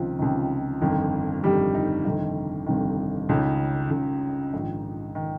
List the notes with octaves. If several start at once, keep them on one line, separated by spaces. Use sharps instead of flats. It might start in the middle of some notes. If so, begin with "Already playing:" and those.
Already playing: C#2 C3 D#3 F3 F4
C#2 C3 D#3
G1 F2 D#3
G1 F2 D#3 G3 G4
D#4
G1 F2 C3 D#3 D#4
G1 F2 C3 D#3
C#2 C#3 D#4
C#2 C#3
A#1 G#2 D#3 D#4
D#3